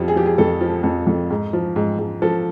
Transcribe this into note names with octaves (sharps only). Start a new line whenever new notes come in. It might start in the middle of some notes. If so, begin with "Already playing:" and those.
Already playing: F2 F3 G4
G#4
F3 G4
G#4
F2 A4
F3
F2
F2
G#2
F3
G#2
G#2
F3 A4